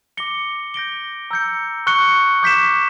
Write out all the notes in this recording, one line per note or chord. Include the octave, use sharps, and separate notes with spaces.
D6 A#6 C#7 G7
G6 A#6 D7 G7
A#5 E6 G6 C#7
C#6 F#6 C#7 G7
D6 G6 B6 E7